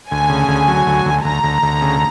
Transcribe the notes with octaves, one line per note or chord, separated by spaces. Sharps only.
D2 G#5
C#3
D2
F#3
D2
D2
D2 A#5
D2
D2
C#3